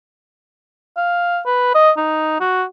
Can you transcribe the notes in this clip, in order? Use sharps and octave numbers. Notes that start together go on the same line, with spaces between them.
F5
B4
D#5
D#4
F#4